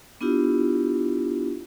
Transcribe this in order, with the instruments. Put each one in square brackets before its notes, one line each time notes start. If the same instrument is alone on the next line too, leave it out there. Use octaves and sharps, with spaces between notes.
[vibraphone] B3 D4 E4 F4 G4